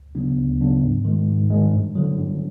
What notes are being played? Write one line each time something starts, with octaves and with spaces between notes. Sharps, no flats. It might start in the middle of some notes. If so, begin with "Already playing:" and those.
Already playing: D2
C#3 F#3 B3 D4
D2
C#3 F#3 B3 D4
G#2
D#3 G#3
G#2
D#3 G#3
G2
D3 F#3
G2